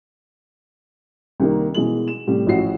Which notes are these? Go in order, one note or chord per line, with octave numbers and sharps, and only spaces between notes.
C2 D#3 A#3
B2 E3 G#3 F#7
E7
A2 C3 G3
A1 F3 E4 F#4 C7